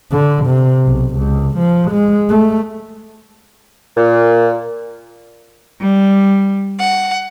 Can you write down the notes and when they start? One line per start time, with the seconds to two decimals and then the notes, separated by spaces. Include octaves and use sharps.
0.11 D3
0.46 C3
0.85 B1
1.16 C#2
1.58 F3
1.91 G#3
2.29 A3
3.96 A#2
5.80 G3
6.79 F#5